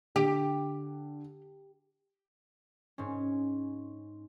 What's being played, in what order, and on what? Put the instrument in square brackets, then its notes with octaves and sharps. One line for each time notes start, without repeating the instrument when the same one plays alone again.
[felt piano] D3 [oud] G4
[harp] G#2 C#4